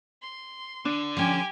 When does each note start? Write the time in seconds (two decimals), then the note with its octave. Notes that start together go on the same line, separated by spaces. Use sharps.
0.22 C6
0.85 D3 D4
1.17 F3 C#4 G4 G#5